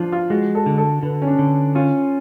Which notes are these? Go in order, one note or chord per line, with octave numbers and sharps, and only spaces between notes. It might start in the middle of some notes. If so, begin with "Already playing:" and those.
Already playing: F3 D4 F4
F4
G#3 F#4
A4
D3
A4
D3 B4
C#4
D4
D3
C#4 F4